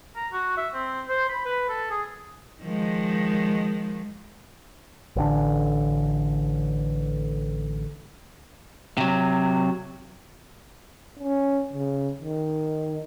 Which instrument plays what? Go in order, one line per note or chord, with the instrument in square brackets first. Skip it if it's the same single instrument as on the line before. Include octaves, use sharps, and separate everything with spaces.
[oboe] A#5
F#4
E5
C4
C5
B5
B4
A4
G#4
[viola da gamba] D#3 F3 G#3
[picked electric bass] A1 D3
[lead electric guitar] C3 F#3
[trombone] C#4
C#3
D#3